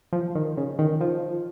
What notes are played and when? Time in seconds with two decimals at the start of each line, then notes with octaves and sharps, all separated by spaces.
0.13 F3
0.35 D#3
0.57 C#3
0.79 D#3
1.01 F3